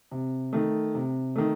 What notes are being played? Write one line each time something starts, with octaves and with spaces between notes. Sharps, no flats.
C3
D#3 A3
C3
D#3 A3